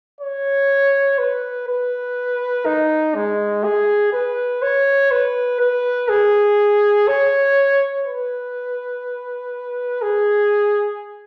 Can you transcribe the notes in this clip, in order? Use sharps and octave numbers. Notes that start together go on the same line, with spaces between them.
C#5
B4
B4
D#4
G#3
G#4
B4
C#5
B4
B4
G#4
C#5
B4
G#4